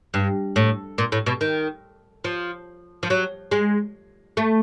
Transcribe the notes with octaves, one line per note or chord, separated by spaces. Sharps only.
G2
A2
A#2
A2
B2
D#3
F3
F3
F#3
G#3
A3